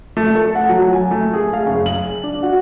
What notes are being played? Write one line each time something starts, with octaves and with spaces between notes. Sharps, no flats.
A3
A4
F#5
F#3
G#5
A3
G#4
F5
F#1
F#7
D4
F#4